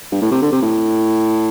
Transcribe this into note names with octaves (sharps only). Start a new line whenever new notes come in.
G2
A2
C3
D3
C3
A2